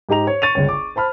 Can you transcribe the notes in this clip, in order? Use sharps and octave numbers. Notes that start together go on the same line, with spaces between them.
G#2 G4 D#5 A#5 F7
C#5
C#6 A6 D#7 F7
G1 C#2 C#5
C#6 D6
C5 A5 B5 F6